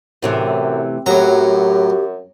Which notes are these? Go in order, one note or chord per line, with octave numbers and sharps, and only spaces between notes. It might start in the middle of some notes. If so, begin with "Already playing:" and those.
F#2 A2 C3 E3
F#2 A2 F#3 G4 A#5